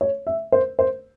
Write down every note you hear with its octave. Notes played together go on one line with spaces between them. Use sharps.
C#5
E5
C5
C5